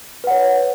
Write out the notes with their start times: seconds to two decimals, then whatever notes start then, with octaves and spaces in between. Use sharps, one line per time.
0.24 B4
0.27 F#5
0.31 C#5